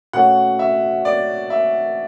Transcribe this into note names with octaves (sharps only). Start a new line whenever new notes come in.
B2 A3 C#4 F#5
E5
D5
E5